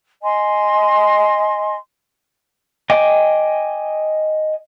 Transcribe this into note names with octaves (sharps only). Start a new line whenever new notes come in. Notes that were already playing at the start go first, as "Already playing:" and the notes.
D#5 G#5 C6
D#5 G5 G#5 D6